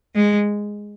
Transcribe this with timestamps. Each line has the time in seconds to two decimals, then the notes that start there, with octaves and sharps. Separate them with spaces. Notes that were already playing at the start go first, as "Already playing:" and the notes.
0.16 G#3